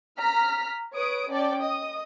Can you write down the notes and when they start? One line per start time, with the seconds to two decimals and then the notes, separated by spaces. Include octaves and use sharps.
0.19 A#5 F6 B6
0.94 B4 C#5 D#6 D7
1.31 C#4 D5 G5 A5
1.61 D#5 D#6